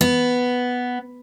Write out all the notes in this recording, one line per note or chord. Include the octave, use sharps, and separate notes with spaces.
B3